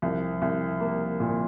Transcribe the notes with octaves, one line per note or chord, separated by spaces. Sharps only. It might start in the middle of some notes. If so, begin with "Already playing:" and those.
C2 F3
C2
A#3
A#2